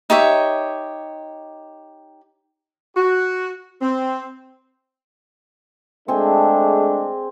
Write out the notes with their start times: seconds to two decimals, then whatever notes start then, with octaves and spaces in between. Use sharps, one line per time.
0.10 D#4 G4 C#5 E5
2.97 F#4
3.82 C4
6.08 G#3 A3 C4 D4 G#4